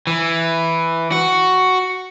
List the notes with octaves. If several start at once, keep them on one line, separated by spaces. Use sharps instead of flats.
E3
F#4